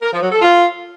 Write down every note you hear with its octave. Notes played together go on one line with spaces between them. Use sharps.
A#4
F3
F#3
A4
F4